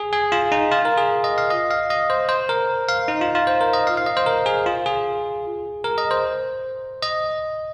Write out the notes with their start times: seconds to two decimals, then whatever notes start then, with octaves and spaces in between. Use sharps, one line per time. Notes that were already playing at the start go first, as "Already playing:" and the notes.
Already playing: G#4
0.13 G#4
0.32 F4
0.52 D#4
0.71 F4
0.85 A#4
0.97 G#4
1.24 D#5
1.38 F5
1.50 D#5
1.71 F5
1.90 D#5
2.10 C5
2.29 C5
2.49 A#4
2.89 F5
3.08 D#4
3.21 F4
3.35 F4
3.47 C5
3.61 A#4
3.73 D#5
3.87 F5
3.97 F5
4.06 D#5
4.17 C5
4.26 A#4
4.46 G#4
4.66 F4
4.86 G#4
5.84 A#4
5.98 D#5
6.11 C5
7.03 D#5